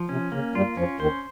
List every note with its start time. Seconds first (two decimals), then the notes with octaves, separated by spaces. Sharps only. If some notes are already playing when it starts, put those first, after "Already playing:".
Already playing: F3
0.09 C3 C#4
0.32 C#3 A#3
0.55 G2 G3 F4
0.77 F2 F3 C#4
1.00 D#2 D#3 C5